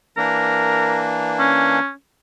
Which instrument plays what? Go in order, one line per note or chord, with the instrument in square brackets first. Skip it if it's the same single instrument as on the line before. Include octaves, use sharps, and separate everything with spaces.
[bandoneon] E3 A#3 D4 [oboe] A#4
[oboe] C#4